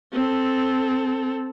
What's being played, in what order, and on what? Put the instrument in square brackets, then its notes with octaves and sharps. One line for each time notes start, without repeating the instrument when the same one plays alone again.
[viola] C4 A4